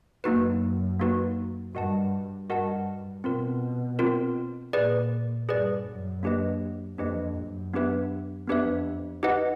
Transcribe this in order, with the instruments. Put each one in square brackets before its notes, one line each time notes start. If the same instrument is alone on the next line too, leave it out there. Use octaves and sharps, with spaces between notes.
[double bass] F#2 [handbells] A#3 D#4 F#4 B4
[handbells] A#3 D#4 F#4 B4
[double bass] G2 [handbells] F#4 A#4 D#5 F#5 A5
[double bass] G2 [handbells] F#4 A#4 D#5 F#5 A5
[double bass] B2 [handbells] C4 F4 A#4
[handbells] C4 F4 A#4
[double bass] A#2 [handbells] G#4 B4 D5
[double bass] G2 [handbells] G#4 B4 D5
[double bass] F#2
[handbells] A#3 D4 G4 B4 D#5
[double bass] F2 [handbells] A#3 D4 G4 B4 D#5
[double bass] F#2
[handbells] B3 D4 G4 B4 E5
[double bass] F2 [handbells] B3 D4 G4 B4 E5
[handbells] D#4 G4 B4 D#5 F#5